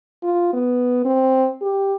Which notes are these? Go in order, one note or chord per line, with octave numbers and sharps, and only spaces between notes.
F4
B3
C4
G4